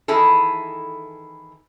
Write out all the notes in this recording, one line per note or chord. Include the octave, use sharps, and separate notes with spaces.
D#3 E3 E4 G#4 A4